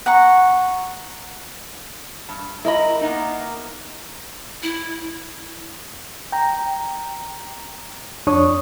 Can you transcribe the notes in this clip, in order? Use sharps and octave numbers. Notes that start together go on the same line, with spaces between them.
F#5 A#5 C#6
G2
E4 A#4 D#5 B5
A#3 B3 D#4
E4
G5 A#5
F2 D4 C#5 C#6 D#6